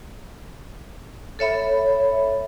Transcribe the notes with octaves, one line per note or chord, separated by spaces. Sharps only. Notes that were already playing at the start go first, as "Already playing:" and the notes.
A4 C#5 E5 B5